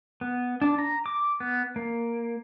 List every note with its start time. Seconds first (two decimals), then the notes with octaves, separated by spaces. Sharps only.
0.21 B3
0.62 D4
0.79 A#5
1.06 D6
1.40 B3
1.76 A#3